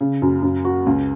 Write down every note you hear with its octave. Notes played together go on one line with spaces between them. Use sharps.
C#3
F#2
F#2
F#4
C#2